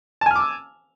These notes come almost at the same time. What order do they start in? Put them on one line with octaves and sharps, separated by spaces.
A5 G#5 F6 D6 E6